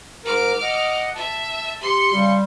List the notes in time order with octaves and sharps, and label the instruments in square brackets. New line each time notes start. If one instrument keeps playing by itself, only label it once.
[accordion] G#2 A#4 [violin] D6 F6
[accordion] D#5 F#5
[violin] E5 [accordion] A5
[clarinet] G4 [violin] C6 C#7
[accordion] C#3 [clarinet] G3